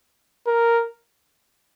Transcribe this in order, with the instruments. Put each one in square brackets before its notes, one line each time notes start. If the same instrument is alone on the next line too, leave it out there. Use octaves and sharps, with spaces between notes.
[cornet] A#4